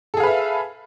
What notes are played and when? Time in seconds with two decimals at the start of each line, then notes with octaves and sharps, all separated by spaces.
0.14 A4
0.17 G#4
0.20 F5
0.23 B4
0.27 E5